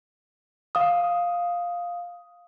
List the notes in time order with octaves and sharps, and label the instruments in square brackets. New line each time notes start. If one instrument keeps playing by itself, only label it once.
[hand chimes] F5 D#6